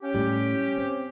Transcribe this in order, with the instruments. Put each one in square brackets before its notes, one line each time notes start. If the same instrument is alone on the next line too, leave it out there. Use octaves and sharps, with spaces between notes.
[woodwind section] C#4 G4
[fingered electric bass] A2 G3
C4